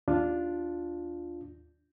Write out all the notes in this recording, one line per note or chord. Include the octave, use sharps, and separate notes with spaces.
D#2 D4 F4